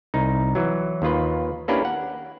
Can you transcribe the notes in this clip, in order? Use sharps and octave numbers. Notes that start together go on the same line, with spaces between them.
C2 D#4
E3 F#3
D#2 D#3 F4 B4
A#3 C#4 D4 E4 G4 B4
F#5